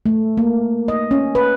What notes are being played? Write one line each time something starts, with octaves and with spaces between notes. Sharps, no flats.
A3
A#3
D#5
C#4
B4